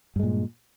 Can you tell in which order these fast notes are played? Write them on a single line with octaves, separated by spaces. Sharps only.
G2 G#3 A#2